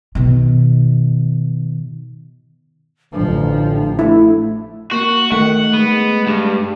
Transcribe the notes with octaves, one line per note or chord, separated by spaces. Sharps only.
B2 D#3
A1 D3 F3 D4
A3 E4
A#3 F#4
D#3 A3 F#5
G#3 B3
G2